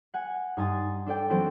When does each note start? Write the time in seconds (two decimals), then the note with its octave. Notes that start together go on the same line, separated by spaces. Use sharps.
0.14 F#5 G#5
0.57 G2 D#4 G#5 C6 D#6 A6
1.06 D4 A4 D5 G5
1.29 E3 F#3 C4 A4 D7